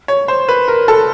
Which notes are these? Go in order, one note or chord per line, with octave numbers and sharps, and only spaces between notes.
C#5
C5
B4
A#4
A4